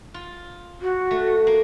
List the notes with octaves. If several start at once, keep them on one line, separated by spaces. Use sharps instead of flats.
F4
F#4
A3
A#3